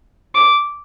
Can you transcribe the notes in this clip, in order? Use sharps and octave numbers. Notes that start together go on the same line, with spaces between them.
D6